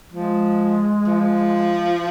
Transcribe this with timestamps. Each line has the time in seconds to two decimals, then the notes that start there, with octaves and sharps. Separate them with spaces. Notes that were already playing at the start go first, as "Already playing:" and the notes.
0.12 F3 G#3
1.07 F3